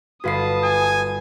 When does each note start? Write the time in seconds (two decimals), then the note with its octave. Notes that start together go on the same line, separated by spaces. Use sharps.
0.24 G1 F#4 B4 F5 A5 D#6 C7
0.64 G#5